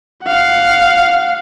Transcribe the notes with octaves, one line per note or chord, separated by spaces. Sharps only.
F5 F#5